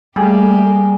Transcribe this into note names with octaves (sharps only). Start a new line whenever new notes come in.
G3 A3 A#3 G4 G#4